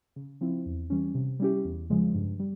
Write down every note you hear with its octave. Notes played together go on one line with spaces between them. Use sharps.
C#3
F3 C4 E4
E2
E3 G3 C#4
C3
G3 C#4 E4 G4
E2
C#3 F3 G#3
G2
G3